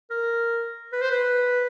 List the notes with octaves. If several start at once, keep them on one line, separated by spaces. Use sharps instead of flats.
A#4
B4
C5
B4